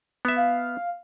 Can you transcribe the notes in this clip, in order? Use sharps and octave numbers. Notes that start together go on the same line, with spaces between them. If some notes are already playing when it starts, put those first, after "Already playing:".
B3 E5
F5